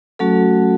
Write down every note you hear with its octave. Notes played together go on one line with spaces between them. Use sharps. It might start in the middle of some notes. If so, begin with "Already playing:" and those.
F#3 A3 C#4 F#4 A4